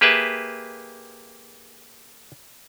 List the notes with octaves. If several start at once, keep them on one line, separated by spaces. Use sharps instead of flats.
A#3 G4 G#4 B4 E5 A5